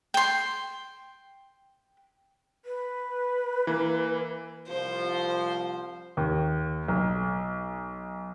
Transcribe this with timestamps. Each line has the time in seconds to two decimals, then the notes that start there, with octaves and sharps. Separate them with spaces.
0.14 G5 C6
2.65 B4
3.67 E3 A#3
4.68 C2 F3 C5
6.17 D#2
6.88 B1